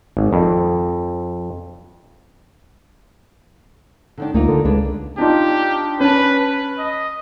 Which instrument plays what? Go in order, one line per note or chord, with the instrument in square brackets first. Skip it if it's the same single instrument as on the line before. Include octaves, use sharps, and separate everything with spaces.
[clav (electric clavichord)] G#1
F2
[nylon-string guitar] D3 D#3 D4
[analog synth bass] D2 [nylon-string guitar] A#3 D#4 F4
[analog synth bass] D3
[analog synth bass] C#2 [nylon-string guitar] D4 G#4 B4
[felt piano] D4 D#4 F4 [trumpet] G4
[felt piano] C#4 A5 [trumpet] B4
[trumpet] B4
D#5